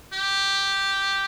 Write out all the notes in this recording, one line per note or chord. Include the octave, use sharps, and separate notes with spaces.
G4